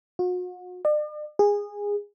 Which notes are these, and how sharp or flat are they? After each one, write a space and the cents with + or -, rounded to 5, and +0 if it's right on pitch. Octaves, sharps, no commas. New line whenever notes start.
F#4 -40
D5 +40
G#4 -20